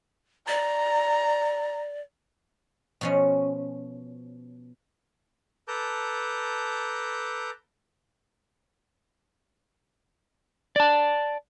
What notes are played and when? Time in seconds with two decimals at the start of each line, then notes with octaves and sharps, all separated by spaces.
0.48 D5 A#5
3.01 B2 F3 C#4
5.68 A4 B4 A5 A#5 D6 G6
10.76 D5 A5